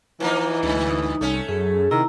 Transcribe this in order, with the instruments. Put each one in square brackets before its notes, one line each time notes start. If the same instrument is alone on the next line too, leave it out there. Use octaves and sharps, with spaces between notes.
[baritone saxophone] E3 [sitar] F3 A#3 D#4
[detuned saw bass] D2 [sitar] G2
[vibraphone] D#4
[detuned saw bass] C2 [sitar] A3 C#4
[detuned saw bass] F#2 [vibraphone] G#4
[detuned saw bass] C3 [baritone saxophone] D#3 [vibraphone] E4 A#5 E6